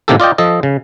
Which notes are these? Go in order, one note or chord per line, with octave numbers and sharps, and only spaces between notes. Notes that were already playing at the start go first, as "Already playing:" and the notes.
A2 C3 D#3 A#3 G4 A4
F4 D5 D#5 G5
F3 A4 D#5
C#3